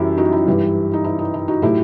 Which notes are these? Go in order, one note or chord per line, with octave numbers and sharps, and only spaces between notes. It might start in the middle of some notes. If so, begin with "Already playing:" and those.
Already playing: F#2 E3 G3 E4 F#4 G4
D#4 F#4
E4
G2 E3 G3
D#4
E4
D#4
E4
D#4 F#4
A2 F#3 A3 E4 G4